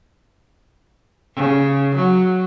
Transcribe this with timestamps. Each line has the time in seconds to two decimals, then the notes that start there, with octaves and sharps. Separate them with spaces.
1.36 C#3
1.95 F#3